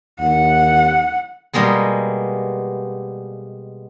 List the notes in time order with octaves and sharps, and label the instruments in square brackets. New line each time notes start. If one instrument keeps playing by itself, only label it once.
[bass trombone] D#2 [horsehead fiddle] F#5
[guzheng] B2 G3 G#3 A#3 B3